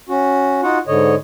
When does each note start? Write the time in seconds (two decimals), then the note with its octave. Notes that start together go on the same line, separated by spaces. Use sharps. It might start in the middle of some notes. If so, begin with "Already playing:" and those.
0.09 C#4 F#4
0.63 D#4 F4 F#4 F#5
0.87 G#2 D3 C#5 D#5